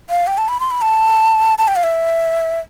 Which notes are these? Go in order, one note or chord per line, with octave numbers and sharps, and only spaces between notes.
F5
G5
A5
B5
C6
B5
A5
A5
G5
F5
E5